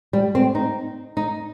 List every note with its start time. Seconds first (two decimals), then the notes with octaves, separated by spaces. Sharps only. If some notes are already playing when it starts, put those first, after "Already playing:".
0.13 G3
0.35 C4
0.55 D#4
1.17 D#4